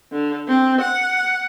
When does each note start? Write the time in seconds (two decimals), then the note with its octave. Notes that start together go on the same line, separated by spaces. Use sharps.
0.12 D3
0.48 C4
0.81 F#5